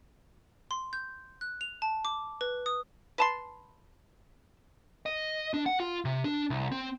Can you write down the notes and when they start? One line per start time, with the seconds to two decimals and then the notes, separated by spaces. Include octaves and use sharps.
0.71 C6
0.93 G6
1.41 F#6
1.61 F7
1.82 A5
2.05 D6
2.41 B4
2.66 D#6
3.18 B4 A5 C6
5.06 D#5
5.54 D4
5.66 F#5
5.80 F4
6.05 C3
6.24 D4
6.50 C2
6.72 C4